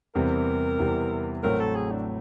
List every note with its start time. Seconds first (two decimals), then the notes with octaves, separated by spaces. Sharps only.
0.15 E2 C3 E3 G3 C4 A#4
0.79 E2 C3 E3 G3 C4
1.43 A1 A2 F#3 A3 C4 A#4
1.60 A4
1.76 G#4
1.92 D4